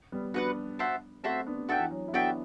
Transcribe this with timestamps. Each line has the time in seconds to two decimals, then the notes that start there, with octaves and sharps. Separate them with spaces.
0.12 G3 B3
0.34 B3 D4 F#4 B4 F#5
0.79 F#4 C5 E5 A5
1.24 A3 C4 F#4 C5 E5 A5
1.46 B3 D4
1.69 B3 D4 F#4 A4 E5 G5
1.80 E3
1.91 F#3
2.08 E4
2.13 B3 D4 F#4 A4 E5 G5